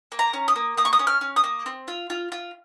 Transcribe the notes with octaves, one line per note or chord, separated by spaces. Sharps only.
A#3
A#5
C#4
D#6
A#3
A#3 D#6
C#6
D#6
C#4
F6
C#4
D#6
A#3
C4
F4
F4
F4